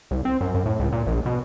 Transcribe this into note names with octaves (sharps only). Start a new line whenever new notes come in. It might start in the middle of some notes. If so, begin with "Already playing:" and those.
C2
C4
F#2
F#2
A2
C#2
A#2
A#1
B2